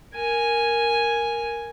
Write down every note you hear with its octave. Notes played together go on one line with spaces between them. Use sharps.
A#4 G#5